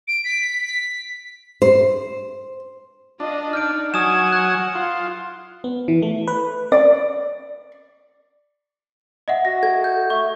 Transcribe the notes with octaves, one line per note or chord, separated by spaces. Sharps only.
D7
B6
C5
D4 F4 D#5
D#4 F6 G6 D7
F#3 F#5 G#5 D#6 E7
F#6
F4
B3
E3
A3
B4
D5
D#5 E5 F#5
F#4 A#6
A4 G#6
G6
A3 C#6